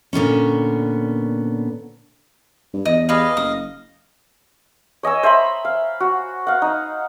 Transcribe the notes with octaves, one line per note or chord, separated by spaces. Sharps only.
A#2 D3 B3 C#4
G2
E2 D#5
G4 G#4 B4 D#5 F5
F#1 D#6
C#5 D#5 G#5 E6
C5 E5 A#5 B5
F5
F#4
F5 F#5
D#4